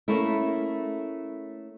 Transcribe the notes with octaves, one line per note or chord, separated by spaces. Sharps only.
A3 A#3 C#4 E4